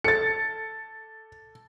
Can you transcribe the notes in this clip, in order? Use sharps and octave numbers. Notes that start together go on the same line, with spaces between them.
A4 A6 C#7